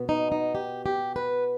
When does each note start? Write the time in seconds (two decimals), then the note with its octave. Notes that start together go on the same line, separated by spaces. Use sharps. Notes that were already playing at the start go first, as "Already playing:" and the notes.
Already playing: B2 B3
0.09 D#4
0.32 D#4
0.55 G4
0.86 G4
1.16 B4